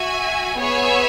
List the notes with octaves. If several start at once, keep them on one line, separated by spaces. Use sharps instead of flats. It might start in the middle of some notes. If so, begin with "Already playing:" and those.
Already playing: F#4 E5 G#5
B3 G#4 C#5 E5 G#5